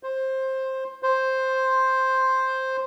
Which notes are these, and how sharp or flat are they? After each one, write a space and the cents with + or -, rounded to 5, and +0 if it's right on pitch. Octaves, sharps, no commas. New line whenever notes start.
C5 +15
C5 +5